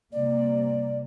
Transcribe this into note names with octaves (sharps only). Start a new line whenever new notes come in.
C3 G3 A#3 D5